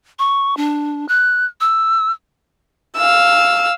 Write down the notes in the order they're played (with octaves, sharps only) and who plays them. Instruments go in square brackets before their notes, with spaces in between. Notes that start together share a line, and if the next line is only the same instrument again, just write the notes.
[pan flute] C#6
D4
F#6
E6
[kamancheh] F5 E6